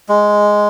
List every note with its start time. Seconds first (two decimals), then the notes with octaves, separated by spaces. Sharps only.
0.09 G#3